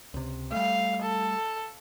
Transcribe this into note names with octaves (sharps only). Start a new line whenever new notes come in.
C#2 C3
G3 A3 F5
A4